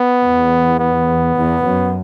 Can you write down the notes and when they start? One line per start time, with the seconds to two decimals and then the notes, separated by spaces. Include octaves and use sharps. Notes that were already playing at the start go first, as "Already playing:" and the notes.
Already playing: B3
0.23 E2
0.79 B3
1.37 E2
1.65 F#2